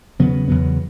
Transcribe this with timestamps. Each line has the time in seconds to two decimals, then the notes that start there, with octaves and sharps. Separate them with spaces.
0.19 E2 C#3 F#3 B3
0.48 E2 C#3 F#3 B3